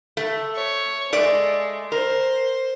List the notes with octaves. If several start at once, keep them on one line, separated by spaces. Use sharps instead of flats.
A3
C#5
G#3 A3 D5
A#4 C5